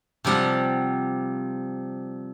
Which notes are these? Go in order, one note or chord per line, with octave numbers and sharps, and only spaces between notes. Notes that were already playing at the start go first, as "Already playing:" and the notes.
C3 F3 G3 F#5 A5